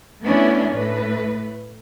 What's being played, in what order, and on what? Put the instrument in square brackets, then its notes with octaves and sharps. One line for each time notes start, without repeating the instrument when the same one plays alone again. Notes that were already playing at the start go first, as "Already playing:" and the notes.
[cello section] A3 B3 C#4 D4 E4
A2 A3 B4